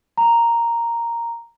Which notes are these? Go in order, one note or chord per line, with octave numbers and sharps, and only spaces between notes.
A#5